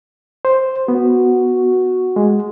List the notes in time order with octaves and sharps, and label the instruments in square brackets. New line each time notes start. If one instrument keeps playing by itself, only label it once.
[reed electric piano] C5
[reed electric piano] B3 [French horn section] F#4
[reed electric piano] G#3